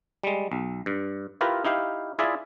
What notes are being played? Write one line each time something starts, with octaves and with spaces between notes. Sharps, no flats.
G3 G#3
B1
G2
E4 F4 G4 A#4 B4
D#4 E4 G4 F5
E4 F4 G#4 D5 E5